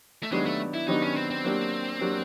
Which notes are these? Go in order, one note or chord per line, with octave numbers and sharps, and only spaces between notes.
A3
D#3 F#3 G#3 B3 D4 G4
A3
E4
D#3 F#3 B3 D4 D#4 G4
C#4
C4
C4
F#3 A#3 D4 G4
F#3 A#3 D4 G4